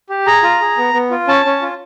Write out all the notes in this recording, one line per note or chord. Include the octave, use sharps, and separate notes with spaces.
G4
G#4 A#5
F4
G#4
B3
B3
F4
C#4 A5
C#4
F4